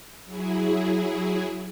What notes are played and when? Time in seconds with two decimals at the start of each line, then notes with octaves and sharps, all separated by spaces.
0.25 F#3 E4 G#4